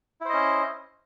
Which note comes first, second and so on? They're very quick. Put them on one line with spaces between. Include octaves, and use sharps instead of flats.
E4 C5 D#5 C#4